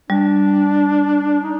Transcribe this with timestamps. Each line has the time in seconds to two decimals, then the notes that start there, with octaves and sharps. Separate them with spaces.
0.10 G3 D4
1.43 D#4